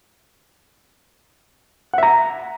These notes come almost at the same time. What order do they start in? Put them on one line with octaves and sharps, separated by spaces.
F#5 E5 A#5